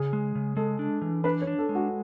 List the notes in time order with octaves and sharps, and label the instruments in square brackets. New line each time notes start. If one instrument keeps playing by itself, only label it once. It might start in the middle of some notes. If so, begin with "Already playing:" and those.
Already playing: [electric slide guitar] C#3 [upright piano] G#4
[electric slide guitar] G#3
C#3
[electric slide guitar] G#3 [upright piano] A4
[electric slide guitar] D4
E3
[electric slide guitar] D4 [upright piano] B4
[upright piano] C#5
[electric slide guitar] D4
[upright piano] A4
[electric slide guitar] G#3
[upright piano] F#4